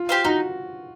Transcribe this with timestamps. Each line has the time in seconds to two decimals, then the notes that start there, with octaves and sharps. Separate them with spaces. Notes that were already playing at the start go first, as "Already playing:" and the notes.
Already playing: F4
0.09 G4 C5 F5
0.25 D#4 F#4